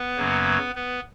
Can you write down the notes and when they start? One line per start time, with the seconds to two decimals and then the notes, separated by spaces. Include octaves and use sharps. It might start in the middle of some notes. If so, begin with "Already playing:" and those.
Already playing: B3 B4
0.17 F#2 C#3 F#3 A#3
0.75 B3 B4